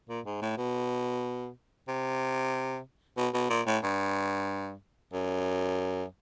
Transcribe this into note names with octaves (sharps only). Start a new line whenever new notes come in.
A#2
G#2
A2
B2
C3
B2
B2
A#2
A2
G2
F#2